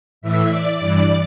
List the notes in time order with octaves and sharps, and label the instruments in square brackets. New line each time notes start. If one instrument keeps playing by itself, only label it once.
[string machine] A2 E3 E5
D5
G2 E3